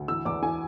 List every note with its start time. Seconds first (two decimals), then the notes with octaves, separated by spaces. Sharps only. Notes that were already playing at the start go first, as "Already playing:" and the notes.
Already playing: D2
0.08 E3 E6
0.25 E2 D6
0.42 E3 G#5